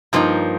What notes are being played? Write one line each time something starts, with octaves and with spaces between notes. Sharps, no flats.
G2 F3 A#3 D#4